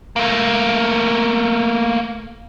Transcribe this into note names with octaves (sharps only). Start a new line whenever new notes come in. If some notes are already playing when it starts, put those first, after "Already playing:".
A3 A#3